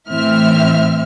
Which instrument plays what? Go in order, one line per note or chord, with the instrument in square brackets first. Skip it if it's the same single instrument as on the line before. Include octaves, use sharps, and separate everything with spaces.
[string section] A2 E3 C4 E5 F6